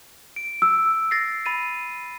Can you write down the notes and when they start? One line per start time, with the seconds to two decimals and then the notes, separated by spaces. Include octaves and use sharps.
0.36 D7
0.62 E6
1.11 A6 A#6 C7
1.46 B5 A6 D#7